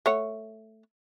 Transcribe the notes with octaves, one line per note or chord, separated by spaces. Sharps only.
A3 C#5 F#5